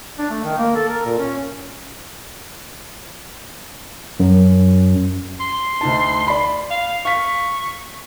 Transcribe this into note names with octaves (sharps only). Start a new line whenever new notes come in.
D4
A3
D#3
A#3
A4
A#4
A#2
C#4
F#2
C6
D2 D#4 A5
D5 B5
F5
F5 C#6 B6